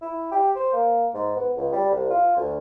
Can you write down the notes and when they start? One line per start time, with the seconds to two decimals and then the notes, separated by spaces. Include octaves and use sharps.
0.01 E4
0.32 G4
0.55 C5
0.73 A#3
1.14 G#2
1.36 B3
1.56 C#2
1.72 G3
1.92 C2
2.10 F4
2.36 D2